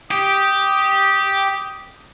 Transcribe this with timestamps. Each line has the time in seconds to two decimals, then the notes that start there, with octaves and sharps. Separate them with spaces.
0.11 G4 D#6